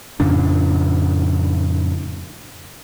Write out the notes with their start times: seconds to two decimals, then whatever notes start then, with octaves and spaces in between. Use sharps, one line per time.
0.20 F2 A2 C#3 D4